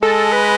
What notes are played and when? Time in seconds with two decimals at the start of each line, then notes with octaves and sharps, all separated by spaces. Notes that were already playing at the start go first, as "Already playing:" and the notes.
0.02 G#3 A4
0.32 B4